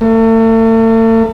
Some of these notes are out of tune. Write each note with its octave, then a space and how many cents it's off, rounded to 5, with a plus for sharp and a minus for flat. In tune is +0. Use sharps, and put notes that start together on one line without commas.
A3 +40